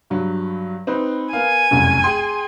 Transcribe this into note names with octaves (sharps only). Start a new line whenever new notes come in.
G2 F#3
C4 D#4 B4
B3 A#4 F5 G#5
F1 C2 F#2
G#4 G5 C6